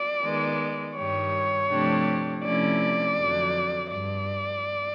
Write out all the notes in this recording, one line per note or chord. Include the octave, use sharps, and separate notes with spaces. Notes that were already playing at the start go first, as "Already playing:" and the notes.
Already playing: D5
D#3 G#3 B3
G2 D#3 G3 C#5
C3 F3 A3 D4 G4
C3 F3 A3 C#4 E4 D5
F2 D3 F#3
G2 D5